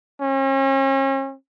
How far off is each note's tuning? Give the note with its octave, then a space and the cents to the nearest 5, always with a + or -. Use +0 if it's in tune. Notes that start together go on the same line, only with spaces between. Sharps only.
C#4 -40